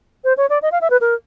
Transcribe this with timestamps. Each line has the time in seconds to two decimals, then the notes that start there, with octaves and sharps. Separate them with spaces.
0.24 C5
0.37 C#5
0.50 D5
0.62 D#5
0.72 F5
0.81 E5
0.90 B4
1.01 A#4